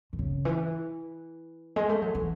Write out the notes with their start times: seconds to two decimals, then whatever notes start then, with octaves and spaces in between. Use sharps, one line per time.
0.13 D#3
0.19 C#3
0.45 E3
1.76 G#3
1.89 A3
2.02 F#3
2.15 E3